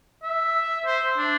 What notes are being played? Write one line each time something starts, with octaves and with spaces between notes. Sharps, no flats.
E5
C5
D4